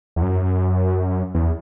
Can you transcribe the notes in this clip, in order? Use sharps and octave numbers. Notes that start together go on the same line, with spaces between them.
E2
F#2
E2